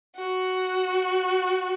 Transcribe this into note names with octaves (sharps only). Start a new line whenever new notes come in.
F#4